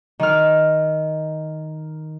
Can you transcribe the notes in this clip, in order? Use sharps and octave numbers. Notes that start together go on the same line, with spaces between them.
D#3 F6